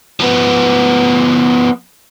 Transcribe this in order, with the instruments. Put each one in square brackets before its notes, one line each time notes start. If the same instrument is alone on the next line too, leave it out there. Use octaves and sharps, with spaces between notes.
[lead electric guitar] F3 B3